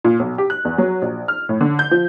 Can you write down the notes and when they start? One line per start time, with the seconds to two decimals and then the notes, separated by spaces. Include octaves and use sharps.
0.04 A#2
0.20 B1
0.38 G4
0.50 F#6
0.65 E2
0.78 F#3
1.02 A#1
1.28 F6
1.49 A2
1.61 D3
1.79 G6
1.91 F3